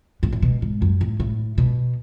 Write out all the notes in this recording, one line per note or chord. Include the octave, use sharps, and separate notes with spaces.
G#2
A2
B2
G#2
F#2
A2
A2
B2